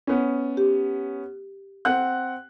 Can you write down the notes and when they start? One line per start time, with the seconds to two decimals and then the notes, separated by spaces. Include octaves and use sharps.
0.07 B3 C#4
0.57 G4
1.85 C4 F#5 F#6